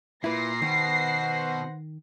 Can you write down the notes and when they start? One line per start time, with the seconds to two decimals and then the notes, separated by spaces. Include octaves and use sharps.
0.24 A#2 E4 B4 A#6 C7
0.62 B2 D#3 B4 C5 F#5